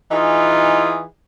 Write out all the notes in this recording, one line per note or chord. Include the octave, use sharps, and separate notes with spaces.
E3 D#4 F4 G#4